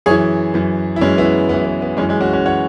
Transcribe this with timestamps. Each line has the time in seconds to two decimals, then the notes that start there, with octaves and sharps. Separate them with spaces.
0.06 F#2 G#4 C#5
0.10 E3
0.54 F#2 E3
0.96 E4
1.01 F#2 E3 G#3 C#4
1.18 B3 E4
1.49 F#2 E3 B3
1.65 B3
1.82 B3
1.97 F#2 E3 G#3 C#4
2.09 G#3 C#4
2.21 C#4 F#4
2.33 C#4 F#4
2.46 E3 C#5 F#5